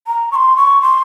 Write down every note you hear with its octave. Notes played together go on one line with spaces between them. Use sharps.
A#5
C#6
C6
C#6
C6